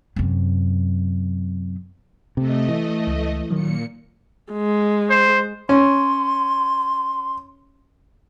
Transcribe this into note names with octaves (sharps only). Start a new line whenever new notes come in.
F#2 C3
C3 A3 D#5
E3
C#2
A#2 D#3 F#3 C#7
G#3
C5
C#4 C6